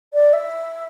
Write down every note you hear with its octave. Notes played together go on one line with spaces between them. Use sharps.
D5
E5